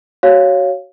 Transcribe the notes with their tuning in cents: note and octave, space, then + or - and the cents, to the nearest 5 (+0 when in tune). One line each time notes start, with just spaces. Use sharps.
F#4 +25 C#5 +0 F5 +0